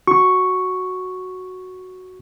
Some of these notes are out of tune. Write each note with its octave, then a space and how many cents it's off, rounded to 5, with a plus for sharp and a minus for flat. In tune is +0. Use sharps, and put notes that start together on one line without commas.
F#4 +0 C#6 +0